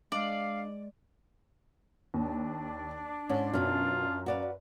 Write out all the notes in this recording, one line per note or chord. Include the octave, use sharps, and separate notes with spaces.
G#3 D4 D5 D#5 F5
D#2 D4
G#2 C#4
F#2 B2 C#4 D#4 F4
F#4 B4 D5 F5